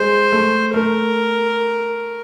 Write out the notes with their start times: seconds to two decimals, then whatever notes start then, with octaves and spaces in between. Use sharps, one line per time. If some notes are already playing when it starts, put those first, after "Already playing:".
Already playing: G#3 C5
0.32 A3
0.74 A3 A#4